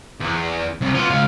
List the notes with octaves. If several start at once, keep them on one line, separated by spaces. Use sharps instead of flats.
E2
C2
B3 F4
C#2 F5